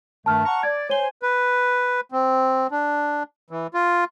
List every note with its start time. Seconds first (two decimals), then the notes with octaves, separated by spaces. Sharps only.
0.26 G2 D#3 A3 A5 F6
0.46 F#5 A#5 C#6
0.63 D5 G#6
0.90 C5 C#5 G#5 G7
1.23 B4
2.12 C4
2.71 D4
3.50 E3
3.74 F4